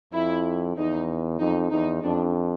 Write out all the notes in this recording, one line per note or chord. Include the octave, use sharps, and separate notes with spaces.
F2 E4
E2 D#4
F2 D#4
E2 D#4
F2 D4